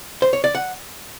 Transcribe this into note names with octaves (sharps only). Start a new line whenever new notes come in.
C5
C#5
D5
F#5